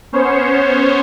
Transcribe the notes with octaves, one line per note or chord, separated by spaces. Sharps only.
B3 C#4 C5 C#5